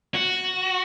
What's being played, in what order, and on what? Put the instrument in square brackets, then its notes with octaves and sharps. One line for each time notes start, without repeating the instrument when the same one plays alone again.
[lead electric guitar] F#4